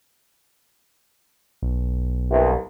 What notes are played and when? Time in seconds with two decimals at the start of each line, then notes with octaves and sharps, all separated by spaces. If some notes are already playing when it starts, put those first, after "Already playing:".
1.62 B1
2.31 C2 G2